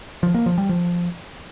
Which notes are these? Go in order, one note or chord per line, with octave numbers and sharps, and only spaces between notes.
F3
A#3
F3
G3
F3